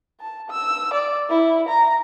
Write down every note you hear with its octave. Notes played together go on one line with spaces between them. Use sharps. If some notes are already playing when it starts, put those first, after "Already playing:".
A5
E6
D5
E4
A#5